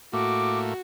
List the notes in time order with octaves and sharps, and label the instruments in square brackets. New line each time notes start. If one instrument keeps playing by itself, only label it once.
[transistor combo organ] A2 A3 A#3 [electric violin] F#4 [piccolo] D6